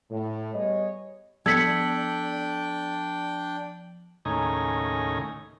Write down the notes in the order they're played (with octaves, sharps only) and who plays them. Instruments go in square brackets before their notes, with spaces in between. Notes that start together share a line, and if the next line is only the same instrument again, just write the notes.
[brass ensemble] A2
G3 B3 G#4 C#5 D#5
[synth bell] F3 F#7 [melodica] D4 G5 [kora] A4 [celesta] G#6 B6 C#7
[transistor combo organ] D#2 A2 C#3 D#4 G#5 A#5